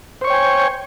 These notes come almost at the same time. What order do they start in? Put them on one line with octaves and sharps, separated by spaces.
C5 C#6 C#5 G5 G#5